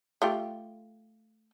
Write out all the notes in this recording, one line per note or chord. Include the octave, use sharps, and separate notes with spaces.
A3 F4 G4